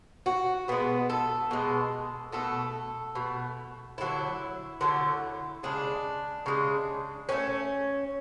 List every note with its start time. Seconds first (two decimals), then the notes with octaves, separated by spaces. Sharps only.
0.26 F#4
0.68 B2 G#3 B3
1.10 A4
1.51 B2 G#3
2.32 B2 A3 A4
3.15 B2 A3
3.98 D3 F#3 A3 E4
4.81 D3 F#3 A3
5.63 C#3 G#3 D4
6.46 C#3 G#3
7.29 D3 C#4
7.32 A3